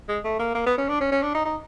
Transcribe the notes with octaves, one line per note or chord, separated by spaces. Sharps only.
G#3
A3
A#3
A#3
B3
C#4
D4
C#4
C#4
D4
D#4
D#4